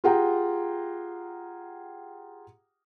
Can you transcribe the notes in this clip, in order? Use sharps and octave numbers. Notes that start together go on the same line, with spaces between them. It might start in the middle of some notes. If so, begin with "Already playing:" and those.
F4 G4 G#4 F#5 G5 A#5